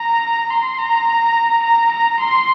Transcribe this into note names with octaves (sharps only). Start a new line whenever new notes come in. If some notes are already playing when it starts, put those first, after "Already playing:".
Already playing: A#5
C6
A#5
A#5
A#5
C6